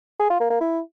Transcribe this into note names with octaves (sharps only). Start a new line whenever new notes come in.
G#4
F4
A#3
A#3
E4